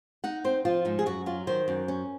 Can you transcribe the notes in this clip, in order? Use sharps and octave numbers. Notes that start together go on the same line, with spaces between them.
D#4 F#5
C4 C5
F3 F4
G#2 D#4
G#4
F#2 F#4
F#3 F4
D#3 C5
F#2
C#4